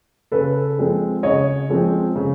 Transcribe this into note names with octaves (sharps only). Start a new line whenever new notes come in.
C#3 A4 B4
F3 G#3 C4
C#3 C#5 D#5
F3 G#3 C4
C#3